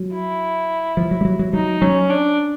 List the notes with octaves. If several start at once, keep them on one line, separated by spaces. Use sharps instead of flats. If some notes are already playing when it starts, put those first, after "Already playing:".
Already playing: F#3
E4
F3
F#3
G3
F#3
F#3
F#3 D#4
F#3 C#4
D4